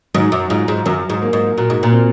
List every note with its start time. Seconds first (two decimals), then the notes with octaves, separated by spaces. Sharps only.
0.14 G#2 F#3
0.32 F#2
0.50 G#2 F4
0.68 G#2
0.86 F#2 F#3
1.10 G#2
1.22 A#3
1.33 G#2
1.58 A#2 F#4
1.70 G#2
1.83 A#2
1.92 C4